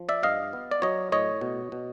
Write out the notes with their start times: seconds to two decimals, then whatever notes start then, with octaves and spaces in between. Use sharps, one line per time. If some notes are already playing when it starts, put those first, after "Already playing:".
Already playing: F3
0.09 D5 E5
0.23 G2 D#5 F5
0.53 B3
0.71 D5
0.82 F#3 C#5 D#5
1.12 A2 C#5 D#5
1.41 B2
1.72 B2